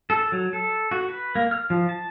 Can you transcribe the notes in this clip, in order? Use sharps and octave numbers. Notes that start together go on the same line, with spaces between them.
A4
F#3
A4
F#4
B4
A#3
F6
F3
A5